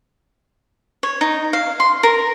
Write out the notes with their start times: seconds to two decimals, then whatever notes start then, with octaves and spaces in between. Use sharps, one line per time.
1.03 C#5
1.21 D#4
1.53 F5
1.80 C6
2.03 A#4